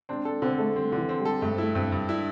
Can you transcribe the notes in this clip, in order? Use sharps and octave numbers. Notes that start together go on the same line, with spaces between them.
C4 D4
D4 A4
D3 C4
A3 A4
G3 C4
D3 E3
C4
G3
A4
G2 A3
C4
A3 E4
G2 C4
G2
D4 E4